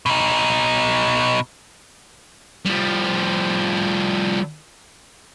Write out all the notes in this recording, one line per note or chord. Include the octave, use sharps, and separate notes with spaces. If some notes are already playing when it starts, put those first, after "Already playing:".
B2 D#4
F3 G3